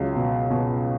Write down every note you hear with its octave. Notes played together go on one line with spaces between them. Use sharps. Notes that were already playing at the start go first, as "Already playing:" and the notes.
Already playing: C#2 F#3
B2
B2